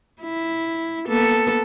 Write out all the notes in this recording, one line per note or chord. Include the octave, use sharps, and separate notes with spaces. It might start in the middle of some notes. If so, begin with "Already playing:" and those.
E4
A#3 B3 A4